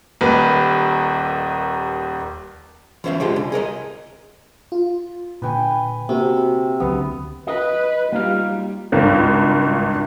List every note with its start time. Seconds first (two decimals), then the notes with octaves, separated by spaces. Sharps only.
0.21 D#1 D#2 B4
3.04 E3 C#4 C5 E5 F5
3.20 D3 F3 G#3 G4
3.36 C2
3.52 G#4 A#4 C#5 D#5
4.72 F4
5.42 A#2 D3 B4 G5 G#5
6.09 C3 A#3 C4 F#4
6.80 C#2 D3 F#3 B3
7.47 B4 D#5
8.12 G3 A#3 D#4 F4 F5
8.92 G#1 C#2 G2